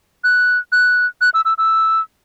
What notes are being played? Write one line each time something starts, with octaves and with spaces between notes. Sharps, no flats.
F#6
F#6
F#6
E6
E6
E6